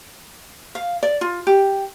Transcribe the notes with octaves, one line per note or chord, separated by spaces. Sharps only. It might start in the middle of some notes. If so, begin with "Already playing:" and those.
F5
D5
F4
G4